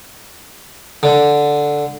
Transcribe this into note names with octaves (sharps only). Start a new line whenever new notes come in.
D3